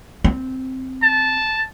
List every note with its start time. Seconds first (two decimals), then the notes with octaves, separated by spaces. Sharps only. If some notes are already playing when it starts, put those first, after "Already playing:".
0.24 C4
1.03 A5